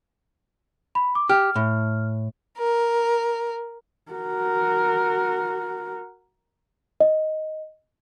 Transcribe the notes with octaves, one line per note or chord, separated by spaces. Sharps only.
B5
D6
G4 F6
A2
A#4
F#4 A#4
D#5